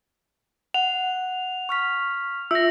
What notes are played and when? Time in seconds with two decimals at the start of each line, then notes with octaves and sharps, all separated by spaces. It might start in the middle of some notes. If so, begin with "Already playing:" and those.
0.74 F#5 F7
1.69 C#6 F6 B6
2.51 F4 E5 E6 A#6